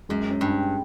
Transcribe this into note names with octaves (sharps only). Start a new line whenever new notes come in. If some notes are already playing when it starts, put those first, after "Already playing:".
F#2 G#3
C#4
G2
C#4